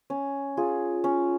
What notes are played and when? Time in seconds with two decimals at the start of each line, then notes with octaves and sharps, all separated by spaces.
0.10 C#4
0.57 F4 G#4
1.04 C#4